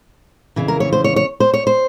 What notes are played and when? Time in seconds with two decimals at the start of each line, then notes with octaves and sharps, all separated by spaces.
0.56 F2 C#3 E3
0.68 A#4
0.80 C#5
0.93 C5
1.04 C#5
1.16 C#5
1.40 C5
1.54 C#5
1.67 C5